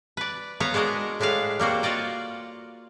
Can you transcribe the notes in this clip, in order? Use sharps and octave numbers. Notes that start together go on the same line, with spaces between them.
B4 D5
B3 C#5 F5 A#5
G#3 D4 F#4 A#4 D#5
A2 G#3 D4 B4 F5
G3 A#3 F#4 C5
F4 F#4 D5 D#5